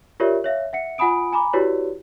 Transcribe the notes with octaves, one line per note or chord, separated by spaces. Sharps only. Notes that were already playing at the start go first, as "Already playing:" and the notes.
F4 G4 A#4 C#5 D5 E5
C#5 E5 F5
E5 F#5 C#7
F4 F#5 G#5 B5 D#6 D7
G#5 A#5 B5 D6
E4 F#4 G4 B4 C#5 D5